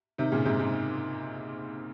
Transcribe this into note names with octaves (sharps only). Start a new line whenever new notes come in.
C3 D#3
A#2 C#3
G#2 C3
G#2